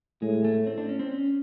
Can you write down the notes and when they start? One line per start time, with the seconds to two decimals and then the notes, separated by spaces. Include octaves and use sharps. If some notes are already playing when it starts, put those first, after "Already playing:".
0.22 A2 G#3
0.44 A3
0.67 C4
0.78 D4
0.89 C#4
0.99 C4
1.11 C#4